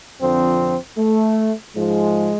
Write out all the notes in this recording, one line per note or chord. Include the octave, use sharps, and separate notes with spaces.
F2 D3 F3 C4
A3
G#2 F3 G#3